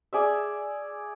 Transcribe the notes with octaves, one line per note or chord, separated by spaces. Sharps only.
G#4 D5 E5